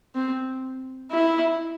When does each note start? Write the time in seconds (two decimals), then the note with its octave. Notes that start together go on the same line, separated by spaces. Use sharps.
0.15 C4
1.11 E4